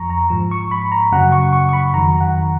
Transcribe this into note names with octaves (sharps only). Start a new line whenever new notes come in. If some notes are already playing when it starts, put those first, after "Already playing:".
Already playing: F2 F3 A#5 C#6
A#5
G#2 F3
C#6
B5
A#5
F#2 C#3 F#3 F#5
C#6
C#6
C#6
B5
F2 D#3 F#3 A#5
F#5